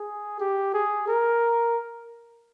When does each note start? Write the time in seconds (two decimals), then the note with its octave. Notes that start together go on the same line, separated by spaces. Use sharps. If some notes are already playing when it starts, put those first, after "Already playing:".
Already playing: G#4
0.40 G4
0.74 G#4
1.08 A#4